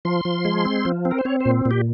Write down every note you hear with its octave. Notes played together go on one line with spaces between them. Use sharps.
F3 C6
F3
G#3
C4
F3
C4
A#4
C5
C4 C#5
C5
A#2
A#2
G4